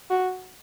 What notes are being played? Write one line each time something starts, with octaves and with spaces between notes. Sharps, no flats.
F#4